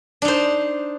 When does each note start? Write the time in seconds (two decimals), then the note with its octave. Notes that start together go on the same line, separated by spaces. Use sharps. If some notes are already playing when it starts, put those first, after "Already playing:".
0.22 D4
0.25 D#4
0.28 C5